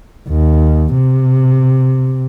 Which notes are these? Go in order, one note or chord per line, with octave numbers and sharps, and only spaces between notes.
D#2
C3